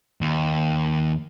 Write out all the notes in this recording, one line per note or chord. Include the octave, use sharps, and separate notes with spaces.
D#2